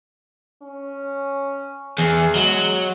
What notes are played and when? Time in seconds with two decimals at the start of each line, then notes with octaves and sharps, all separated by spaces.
0.63 C#4
1.98 E2 G#4
2.35 F#3 G#3